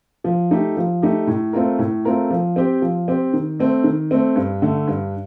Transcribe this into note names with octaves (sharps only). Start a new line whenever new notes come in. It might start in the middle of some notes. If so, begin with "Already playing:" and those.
F3
A3 D#4 G4
F3
A3 D#4 G4
A2
A3 C4 F4 A#4
A2
A3 C4 F4 A#4
F3
C4 G4
F3
C4 G4
D#3
A3 C4
D#3
A3 C4
G2
D3 A3
G2